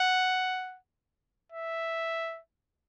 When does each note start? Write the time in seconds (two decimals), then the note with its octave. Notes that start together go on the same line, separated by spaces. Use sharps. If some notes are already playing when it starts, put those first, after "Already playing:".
Already playing: F#5
1.52 E5